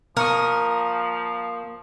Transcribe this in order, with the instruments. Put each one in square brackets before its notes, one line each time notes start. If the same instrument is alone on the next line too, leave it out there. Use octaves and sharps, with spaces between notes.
[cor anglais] F3 [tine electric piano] A#3 C#6 D#6 [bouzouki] A#4